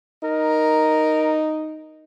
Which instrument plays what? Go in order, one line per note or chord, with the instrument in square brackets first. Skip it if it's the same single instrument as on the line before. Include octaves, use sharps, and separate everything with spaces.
[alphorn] D#4 [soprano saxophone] A#4